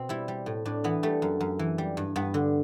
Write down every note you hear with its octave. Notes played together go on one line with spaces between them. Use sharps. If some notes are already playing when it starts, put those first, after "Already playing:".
Already playing: B2 C4
G3 E4
G3
A2
A2 D4
E3 B3
G3 A3
F#2
F#2
E3
G3
G2
G2 B3
D3